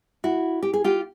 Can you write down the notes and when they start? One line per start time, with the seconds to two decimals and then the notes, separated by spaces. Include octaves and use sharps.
0.24 E4 F#4
0.63 G4
0.74 G#4
0.84 F4 G4